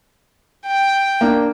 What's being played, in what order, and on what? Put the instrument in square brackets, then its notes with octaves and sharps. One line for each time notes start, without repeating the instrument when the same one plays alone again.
[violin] G5
[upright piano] A#3 D4